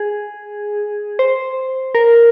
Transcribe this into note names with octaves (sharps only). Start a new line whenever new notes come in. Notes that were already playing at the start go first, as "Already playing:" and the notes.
Already playing: G#4
C5
A#4